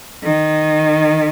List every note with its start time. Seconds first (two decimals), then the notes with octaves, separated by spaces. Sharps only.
0.23 D#3